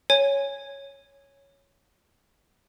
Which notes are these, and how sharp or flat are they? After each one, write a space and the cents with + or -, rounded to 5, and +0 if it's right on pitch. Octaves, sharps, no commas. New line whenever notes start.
C#5 +0 G#5 +0